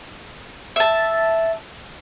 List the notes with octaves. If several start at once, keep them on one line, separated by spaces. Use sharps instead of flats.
E5 A5